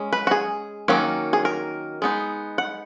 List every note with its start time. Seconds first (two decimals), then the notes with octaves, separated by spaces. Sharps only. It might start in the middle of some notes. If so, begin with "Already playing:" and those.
Already playing: G#3 C#4
0.13 B4
0.27 F#4
0.31 G#4
0.88 D#3 F#3 A#3 C#4
1.33 G#4
1.45 A#4
2.02 G#3 B3 D#4
2.58 F#5